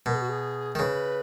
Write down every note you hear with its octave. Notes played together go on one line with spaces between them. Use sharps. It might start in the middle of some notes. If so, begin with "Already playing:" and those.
B2 A#4
G#4
F#4
G#4
D#3
C#3 B4